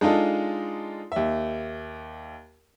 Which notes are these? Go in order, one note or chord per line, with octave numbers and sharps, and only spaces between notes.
G#3 D4 D#4 F4 A4
D#2 E5